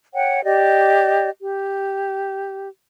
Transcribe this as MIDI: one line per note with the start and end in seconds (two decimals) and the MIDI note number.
0.14 0.43 73
0.14 0.43 78
0.14 0.43 79
0.44 1.29 67
0.44 1.29 74
0.44 1.29 75
1.40 2.68 67